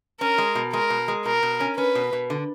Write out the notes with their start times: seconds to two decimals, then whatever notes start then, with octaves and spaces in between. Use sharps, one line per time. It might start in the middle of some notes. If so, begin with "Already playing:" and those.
0.21 C#4 A#4
0.38 G#3
0.55 B2
0.73 G#3 A#4
0.90 B2
1.08 G#3
1.25 B2 A#4
1.43 B2
1.60 C#4
1.77 C#4 B4
1.95 B2
2.13 B2
2.30 D3